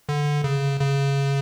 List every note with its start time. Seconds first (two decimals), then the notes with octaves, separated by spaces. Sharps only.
0.09 D3
0.44 C#3
0.80 C#3